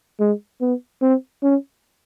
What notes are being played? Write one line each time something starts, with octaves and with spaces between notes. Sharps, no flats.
G#3
B3
C4
C#4